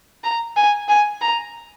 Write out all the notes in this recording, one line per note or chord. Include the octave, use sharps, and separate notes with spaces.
A#5
G#5
G#5
A#5